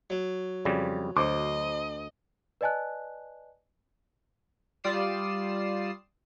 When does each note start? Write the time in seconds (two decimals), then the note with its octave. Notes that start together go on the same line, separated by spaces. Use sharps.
0.10 F#3
0.65 F2 C#3 G3
1.17 D2 C5 D#5 D6
2.61 B4 D5 D#5 G#5 A5 F#6
4.84 G3 F4 D5 D#6 C7 E7